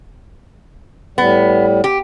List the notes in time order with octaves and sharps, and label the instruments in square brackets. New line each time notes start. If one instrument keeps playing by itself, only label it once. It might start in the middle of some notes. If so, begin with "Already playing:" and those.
[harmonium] A2 G3 [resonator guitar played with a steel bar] B3
[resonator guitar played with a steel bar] G4